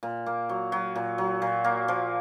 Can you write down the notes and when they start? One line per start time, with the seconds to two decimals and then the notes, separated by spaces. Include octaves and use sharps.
0.03 A#2
0.26 A#3
0.49 F#3
0.72 F#3
0.96 A#2
1.18 F#3
1.42 A#2
1.64 A#3
1.88 F3